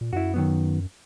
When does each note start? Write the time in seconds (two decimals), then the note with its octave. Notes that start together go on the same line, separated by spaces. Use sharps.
0.01 A#2
0.13 F#2 E4 F#4
0.34 D#3 F#3 B3